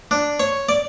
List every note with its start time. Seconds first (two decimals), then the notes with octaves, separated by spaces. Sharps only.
0.11 D4
0.40 C#5
0.69 D5